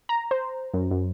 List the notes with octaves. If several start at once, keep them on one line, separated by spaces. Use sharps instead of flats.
A#5
C5
F#2
F#2